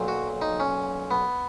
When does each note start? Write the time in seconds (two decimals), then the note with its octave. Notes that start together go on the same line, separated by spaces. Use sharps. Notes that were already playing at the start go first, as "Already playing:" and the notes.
Already playing: B1 A#2 F#3
0.08 F#4
0.42 D#4
0.60 C#4
1.11 B3